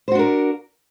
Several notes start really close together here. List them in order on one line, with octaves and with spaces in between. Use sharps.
C5 F#4 D4 A#4